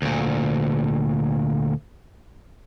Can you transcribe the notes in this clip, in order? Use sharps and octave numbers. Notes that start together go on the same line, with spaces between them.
D2 A#2